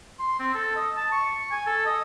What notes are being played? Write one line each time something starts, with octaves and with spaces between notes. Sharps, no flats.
C6
C4
A4
D#5
A5
C#6
G#5
A4
D#5